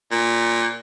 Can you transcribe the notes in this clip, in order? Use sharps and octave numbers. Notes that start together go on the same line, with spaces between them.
A#2